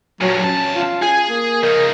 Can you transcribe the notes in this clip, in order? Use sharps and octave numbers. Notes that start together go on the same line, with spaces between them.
G2 A#2 F#3
E2 C#4 A5
F4
G#4 G#5
A#3
C#3 D#4 A#4